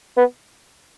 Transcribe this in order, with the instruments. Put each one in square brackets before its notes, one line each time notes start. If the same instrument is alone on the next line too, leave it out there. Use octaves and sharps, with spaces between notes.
[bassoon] B3